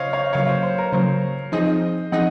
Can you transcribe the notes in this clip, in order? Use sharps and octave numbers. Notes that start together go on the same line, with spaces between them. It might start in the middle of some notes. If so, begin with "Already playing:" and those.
Already playing: C#3 C5 C#5 D#5 F5
C#5 F5
C#3 F#3 A#3 C#5 F5
C5
C5
A#4
C#3 F#3 A#3 C5
F3 C4 D#4 G#4 C5 D#5
F3 C4 D#4 G#4 D#5 F#5